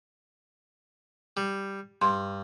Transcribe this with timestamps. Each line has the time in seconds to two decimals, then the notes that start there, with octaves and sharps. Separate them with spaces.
1.37 G3
2.02 G2 C6